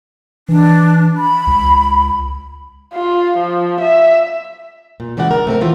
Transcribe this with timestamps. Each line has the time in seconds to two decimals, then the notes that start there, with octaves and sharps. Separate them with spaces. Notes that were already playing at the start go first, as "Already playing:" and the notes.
0.49 E3 D4
1.17 B5
1.47 C#2
2.94 F4
3.38 F3
3.81 E5
5.00 A#2
5.17 C#3 E3 G#3 D5 F#5
5.31 A#4
5.47 A3 C4 A#4
5.61 D#3 E3 C4 F4